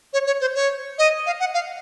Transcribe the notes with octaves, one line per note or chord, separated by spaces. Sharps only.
C#5
C#5
C5
C#5
D#5
F5
F#5
F5